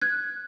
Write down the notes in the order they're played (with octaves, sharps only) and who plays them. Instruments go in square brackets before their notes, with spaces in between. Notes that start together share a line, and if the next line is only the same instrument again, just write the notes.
[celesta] F#6 G#6